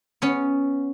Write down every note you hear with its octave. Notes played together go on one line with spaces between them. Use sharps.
B3 C#4